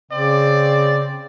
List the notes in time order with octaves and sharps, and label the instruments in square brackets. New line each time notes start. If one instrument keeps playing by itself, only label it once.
[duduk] C#3 [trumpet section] C4 D5